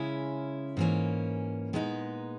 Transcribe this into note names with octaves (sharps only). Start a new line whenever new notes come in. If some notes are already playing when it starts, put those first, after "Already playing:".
Already playing: C#3 G#3 C#4 E4
G#2 E3 A#3 C#4
A#2 G#3 B3 D#4